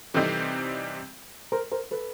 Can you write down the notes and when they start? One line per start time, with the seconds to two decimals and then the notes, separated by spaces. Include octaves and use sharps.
0.14 C3 E3 G3 C4 D#4 A4 B4
1.52 A#4 C5
1.71 A#4 C5
1.91 A4 B4